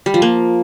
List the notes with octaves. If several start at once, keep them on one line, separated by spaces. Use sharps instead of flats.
G3
F3
A#3